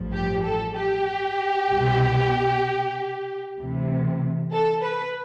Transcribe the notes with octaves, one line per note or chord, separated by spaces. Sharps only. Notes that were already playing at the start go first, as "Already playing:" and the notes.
Already playing: A1 G2 F3
G4
A4
G4
C2 B2
D2 C3 E3
A4
B4